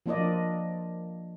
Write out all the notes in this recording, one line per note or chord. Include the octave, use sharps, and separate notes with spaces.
F3 A#3 D4 F4 D5 D#5